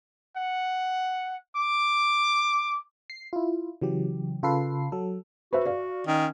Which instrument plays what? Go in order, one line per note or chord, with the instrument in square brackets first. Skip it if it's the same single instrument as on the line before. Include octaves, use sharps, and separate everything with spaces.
[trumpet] F#5
D6
[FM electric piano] C7
E4 F4
C#3 E3 F#3 G4
C#3 F4 A4 B4 C7
F#3 A4
[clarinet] F#4 [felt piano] B4 C5 E5
[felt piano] D5 F5
[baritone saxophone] D#3 [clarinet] C#4